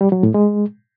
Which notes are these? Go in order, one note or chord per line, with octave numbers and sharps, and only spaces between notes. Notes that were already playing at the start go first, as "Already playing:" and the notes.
G3
F#3
A2
G#3